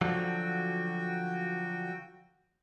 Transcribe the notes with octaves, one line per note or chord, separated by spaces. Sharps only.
D3 F3 F#3 F#4 G5